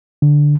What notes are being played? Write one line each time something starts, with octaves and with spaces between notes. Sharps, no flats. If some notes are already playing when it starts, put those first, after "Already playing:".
D3